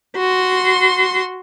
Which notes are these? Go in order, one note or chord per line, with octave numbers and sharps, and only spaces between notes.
F#4 C6